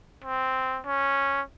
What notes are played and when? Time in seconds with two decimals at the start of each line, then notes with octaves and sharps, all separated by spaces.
0.24 C4
0.86 C#4